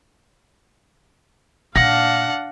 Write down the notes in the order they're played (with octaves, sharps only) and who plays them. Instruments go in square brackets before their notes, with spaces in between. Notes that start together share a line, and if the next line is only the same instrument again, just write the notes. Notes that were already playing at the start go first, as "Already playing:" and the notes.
[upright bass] A#2 [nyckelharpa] D4 F5 [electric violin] F#5 [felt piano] A#6